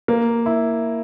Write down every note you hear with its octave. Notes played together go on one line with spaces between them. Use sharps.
A#3
E4